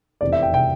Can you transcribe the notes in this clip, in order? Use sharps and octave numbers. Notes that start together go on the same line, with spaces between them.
F1 E2 C3 D5
E5
G5
C3 G5